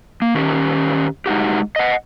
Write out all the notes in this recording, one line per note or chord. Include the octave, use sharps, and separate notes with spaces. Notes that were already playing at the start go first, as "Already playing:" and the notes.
A#3
D#3 C#4 G4
G#3 D#4 F#4 G4
D#5 F#5